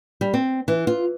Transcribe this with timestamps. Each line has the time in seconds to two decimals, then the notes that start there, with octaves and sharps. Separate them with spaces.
0.21 G3
0.34 C4
0.68 E3
0.87 F4